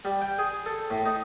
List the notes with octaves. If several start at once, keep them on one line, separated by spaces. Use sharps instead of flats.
G3
G5
G#4
A4
A2
D#4